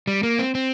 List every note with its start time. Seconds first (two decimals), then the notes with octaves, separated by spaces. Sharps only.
0.07 G3
0.23 A#3
0.39 C4
0.55 C4